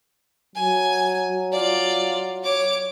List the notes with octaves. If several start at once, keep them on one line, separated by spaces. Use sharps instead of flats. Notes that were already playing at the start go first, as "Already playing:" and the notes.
F#3 G#5
F4 D5
C#5 D6